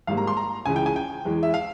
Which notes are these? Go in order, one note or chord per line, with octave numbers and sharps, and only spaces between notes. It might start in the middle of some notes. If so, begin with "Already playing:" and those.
G#1 G#2 G3 A#3 F5
A#5
C6
A#5
C#2 C#3 E3 G#3 G#5
G5
G#5
G5
E2 E3 G#3
E5
F5